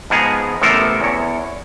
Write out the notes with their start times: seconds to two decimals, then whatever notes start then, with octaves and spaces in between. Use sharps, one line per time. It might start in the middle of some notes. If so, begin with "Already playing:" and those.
0.10 G#2 F3 B3 G#4 G#5 A#5
0.62 A1 C3 B3 A4 A#4 C5
1.00 E2 C#5